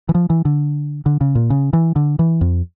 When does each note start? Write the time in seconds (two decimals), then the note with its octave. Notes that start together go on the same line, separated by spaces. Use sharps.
0.09 E3
0.15 F3
0.30 E3
0.45 D3
1.06 D3
1.21 C#3
1.35 A#2
1.50 C#3
1.73 E3
1.96 D3
2.19 E3
2.41 F2